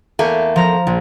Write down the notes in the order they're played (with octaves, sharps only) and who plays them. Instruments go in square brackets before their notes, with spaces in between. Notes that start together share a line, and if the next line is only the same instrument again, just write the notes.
[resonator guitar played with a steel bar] E2 A3 A#3 [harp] G#5
[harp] F3 A#5 A#6
A#1